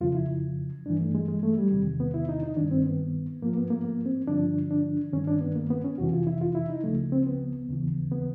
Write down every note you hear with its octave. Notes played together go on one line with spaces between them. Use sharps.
F2 C#3 F3 F4
E4
G2 E3 D4
A3
G#3
G#3
A3
G3
E2 C3 D#3 G3
B3
E4
D#4
D#4
G2 D#3 D4
C4
B3
G#2 F3 A#3
B3
A#3
A#3
C4
G2 D3 F3 D4
D4
G2 D#3 C#4
D4
B3
A#3
B3
C#4
F2 C3 E3 F#4
F4
E4
F4
E4
D#4
C#2 C#3 F3 A3
C4
B3
D#2 C#3 E3
B3